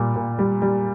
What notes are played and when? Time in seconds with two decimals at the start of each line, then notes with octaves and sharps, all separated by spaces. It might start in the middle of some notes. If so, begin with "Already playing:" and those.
Already playing: A#2 G3
0.16 A#2
0.39 G3
0.62 G3